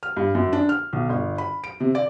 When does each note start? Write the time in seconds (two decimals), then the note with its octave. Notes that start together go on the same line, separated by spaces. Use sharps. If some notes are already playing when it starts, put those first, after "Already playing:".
0.03 F6
0.17 G2
0.35 F#2
0.53 D4
0.69 F6
0.93 B1
1.09 G1
1.38 B5
1.64 D7
1.80 C3
1.95 D5